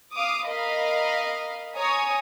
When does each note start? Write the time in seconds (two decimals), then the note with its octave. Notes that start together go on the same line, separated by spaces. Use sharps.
0.14 F5 D6 D#6
0.47 A#4 D#5 F5 B5
1.77 C#5 G#5 A#5 D#6